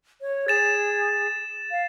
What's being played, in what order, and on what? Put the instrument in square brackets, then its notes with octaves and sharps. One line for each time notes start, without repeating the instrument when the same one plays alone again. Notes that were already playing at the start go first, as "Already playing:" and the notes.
[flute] C#5
[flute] G#4 [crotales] A6 E7
[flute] F5